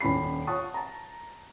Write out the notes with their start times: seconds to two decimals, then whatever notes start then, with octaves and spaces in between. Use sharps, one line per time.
0.01 D#1 C#4 D4 B5 C7
0.47 F4 C#5 F#5 A5 C#6 D#6
0.74 A5 A#5